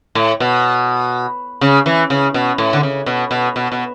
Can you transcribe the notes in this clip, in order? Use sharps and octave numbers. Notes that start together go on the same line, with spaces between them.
A2
B2
C#3
E3
C#3
B2
A2
D3
C#3
B2
B2
B2
B2